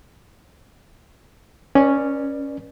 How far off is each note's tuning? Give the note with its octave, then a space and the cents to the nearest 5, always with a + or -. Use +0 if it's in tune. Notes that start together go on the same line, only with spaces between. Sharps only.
C#4 +0 B4 -35 D5 +20